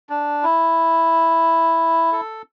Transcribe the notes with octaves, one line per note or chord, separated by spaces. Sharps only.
D4
E4
A4